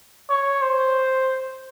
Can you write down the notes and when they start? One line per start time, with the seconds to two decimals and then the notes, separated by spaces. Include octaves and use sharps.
0.29 C#5
0.62 C5